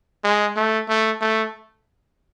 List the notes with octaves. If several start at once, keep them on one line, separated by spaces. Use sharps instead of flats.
G#3
A3
A3
A3